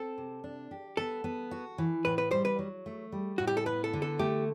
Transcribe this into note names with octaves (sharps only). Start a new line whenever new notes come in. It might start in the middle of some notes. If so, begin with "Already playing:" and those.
Already playing: C4 A4
C3
D4
G4
B3 A4
B3
F#4
E3
A2 B4
B4
G3 C5
B4
F#3
A3
G3
A2 F#4
G4
A4
B3 B4
A4
D3
A4
A3 G4